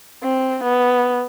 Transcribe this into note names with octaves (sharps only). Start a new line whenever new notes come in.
C4
B3